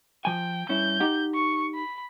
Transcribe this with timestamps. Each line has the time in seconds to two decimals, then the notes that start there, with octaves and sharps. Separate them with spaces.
0.25 F3 G5 G#5
0.69 G2 C#4 E4 G6
1.00 D#4 G4 F#5
1.35 C#6
1.75 B5